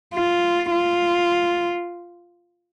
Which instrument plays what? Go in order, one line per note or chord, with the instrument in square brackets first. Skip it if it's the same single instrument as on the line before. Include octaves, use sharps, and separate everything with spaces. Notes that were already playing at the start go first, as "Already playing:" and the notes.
[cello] F4
F4